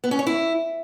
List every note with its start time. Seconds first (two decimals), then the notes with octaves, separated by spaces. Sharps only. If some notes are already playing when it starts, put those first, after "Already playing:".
0.04 B3
0.11 C#4
0.19 C#5
0.27 E4